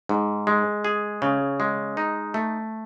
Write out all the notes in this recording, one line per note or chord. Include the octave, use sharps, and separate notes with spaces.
G#2
G#3
G#4
C#3
G#3
D#4
A3